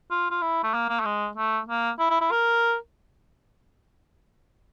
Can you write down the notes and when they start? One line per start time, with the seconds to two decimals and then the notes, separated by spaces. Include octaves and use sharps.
0.11 F4
0.31 F4
0.42 E4
0.63 A3
0.74 A#3
0.89 A#3
1.00 A3
1.05 G#3
1.37 A3
1.69 A#3
1.99 E4
2.10 E4
2.21 E4
2.31 A#4